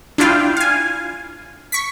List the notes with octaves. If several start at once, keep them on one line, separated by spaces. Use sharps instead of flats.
D4 E4 F4 F5 G5
F5 G#5
C#6 B6